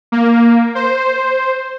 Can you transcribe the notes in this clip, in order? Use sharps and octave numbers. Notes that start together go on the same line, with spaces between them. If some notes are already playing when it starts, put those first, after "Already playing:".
A#3
C5